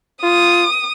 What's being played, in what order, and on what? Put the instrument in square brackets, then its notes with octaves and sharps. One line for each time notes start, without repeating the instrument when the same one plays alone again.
[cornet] F4 [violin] D#6